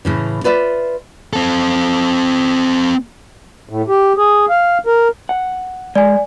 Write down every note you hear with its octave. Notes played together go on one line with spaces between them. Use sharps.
A2 C#3 E3
F4 B4 D5 E5
C4 A4
A2
G4
G#4
F5
A#4
F#5
G#3 D5 G#5